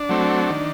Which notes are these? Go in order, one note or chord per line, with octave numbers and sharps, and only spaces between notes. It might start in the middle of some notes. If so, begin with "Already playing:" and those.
Already playing: D4
F#3 A3 C4
D#3